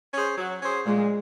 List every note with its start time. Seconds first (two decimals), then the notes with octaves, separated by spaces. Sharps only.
0.14 C#4 G#4 C5
0.38 F#3
0.62 C#4 G#4 C5
0.86 A#2 G#3